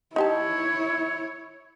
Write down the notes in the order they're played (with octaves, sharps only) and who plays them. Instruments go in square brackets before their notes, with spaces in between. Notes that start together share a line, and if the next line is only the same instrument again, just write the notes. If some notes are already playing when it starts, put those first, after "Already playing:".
[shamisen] D#4 G4 A5 [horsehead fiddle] E4 C#5